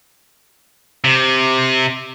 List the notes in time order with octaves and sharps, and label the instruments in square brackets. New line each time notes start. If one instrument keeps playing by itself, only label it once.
[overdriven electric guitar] C3